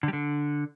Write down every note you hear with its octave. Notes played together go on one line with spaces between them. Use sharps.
D3
G3
D3